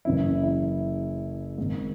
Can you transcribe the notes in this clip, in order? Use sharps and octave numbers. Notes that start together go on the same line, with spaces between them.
F#1 F#2 C#3 E3 E4
E4
G#1 G#2 D#3